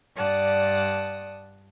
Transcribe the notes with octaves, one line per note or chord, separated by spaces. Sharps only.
G2 D5 F#5 A5 D#6